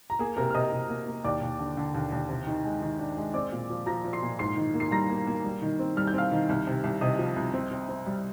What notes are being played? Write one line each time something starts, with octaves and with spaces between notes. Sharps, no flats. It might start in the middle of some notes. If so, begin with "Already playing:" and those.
A#5
A#3 G#4 G#5
C3 A#4 A#5
F6
C3 D#5 D#6
C3
A#3
A#3
D#2 D5 D6
D#2
D3
D3
D#2
D#2
C3
D#3
G#3
D#3
D4
G#3
C4 D5 D6
A#2
F3
F3 A#5 A#6
F3
C6 C7
A#2
G#2 C6 C7
D#3
A#3
C7
G3 A#5 A#6
A#3
A#3
G3
D#3
C4
G3 F6
G6
C4 F5 F6
D#3
C2
C3
C2
C3 D#5 D#6
F3
C2
C4
C4
C4
G3